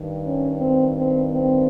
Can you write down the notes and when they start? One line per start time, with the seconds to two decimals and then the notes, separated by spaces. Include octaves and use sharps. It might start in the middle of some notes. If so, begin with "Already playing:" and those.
Already playing: G2 D#3
0.25 C#4
0.61 C4
0.96 C4
1.32 C4